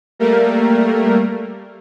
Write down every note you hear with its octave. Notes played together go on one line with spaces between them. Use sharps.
G3 A3 A#3 A#4